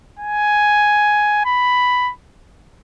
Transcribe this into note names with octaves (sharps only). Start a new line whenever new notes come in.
G#5
B5